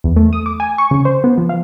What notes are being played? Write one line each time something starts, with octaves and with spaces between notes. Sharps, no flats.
E2
A3
D#6
D6
G#5
C#6
C#3
C5
B3
F3
F5